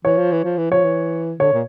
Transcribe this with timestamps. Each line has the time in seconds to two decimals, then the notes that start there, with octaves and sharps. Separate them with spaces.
0.05 E3 C#5
0.17 F3
0.32 E3
0.44 F3
0.57 E3
0.71 F3 C#5
0.84 E3
1.39 D3 C#5
1.53 A#2